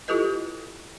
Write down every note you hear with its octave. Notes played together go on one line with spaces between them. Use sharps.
E4 F4 G4 A4 B4 D#5